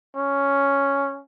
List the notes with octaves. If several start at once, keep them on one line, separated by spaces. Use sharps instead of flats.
C#4